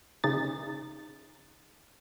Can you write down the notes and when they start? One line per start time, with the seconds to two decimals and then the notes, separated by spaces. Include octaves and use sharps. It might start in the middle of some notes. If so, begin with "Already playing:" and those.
0.24 C#3 D#4 A6